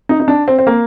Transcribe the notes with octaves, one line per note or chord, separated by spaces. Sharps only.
D#4
D#4
D4
C4
C4
A#3